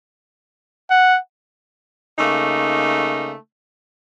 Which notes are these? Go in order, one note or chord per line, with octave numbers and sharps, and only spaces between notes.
F#5
C#3 A3 A#3 D#4